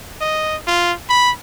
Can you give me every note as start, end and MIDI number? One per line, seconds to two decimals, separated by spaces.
0.21 0.56 75
0.67 0.93 65
1.09 1.31 83